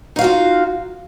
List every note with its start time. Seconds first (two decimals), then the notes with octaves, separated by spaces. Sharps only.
0.16 D#4
0.19 F5
0.21 F#4
0.24 F4